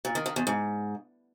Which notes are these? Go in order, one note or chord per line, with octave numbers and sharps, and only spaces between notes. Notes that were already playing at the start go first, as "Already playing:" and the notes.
A#2
D#3
D#3
E2
G#2